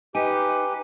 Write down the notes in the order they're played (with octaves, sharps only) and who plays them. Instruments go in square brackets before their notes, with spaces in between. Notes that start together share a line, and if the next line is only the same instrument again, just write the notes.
[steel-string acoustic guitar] D#4 [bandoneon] G4 [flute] B4 [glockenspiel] G#5 D#7